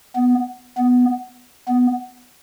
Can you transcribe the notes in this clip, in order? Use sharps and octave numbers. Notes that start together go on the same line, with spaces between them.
B3
B3
B3